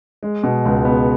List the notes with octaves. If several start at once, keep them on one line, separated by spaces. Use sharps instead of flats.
G#3
B2
C#2
B3